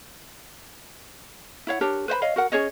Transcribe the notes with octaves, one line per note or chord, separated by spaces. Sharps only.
E4 C#5 F5 F#5
D4 G4 A#4 C#5
B4 C5 D#5 B5
C#5 D#5 F5
F#4 A#4 F#5
C#4 G#4 C#5 D#5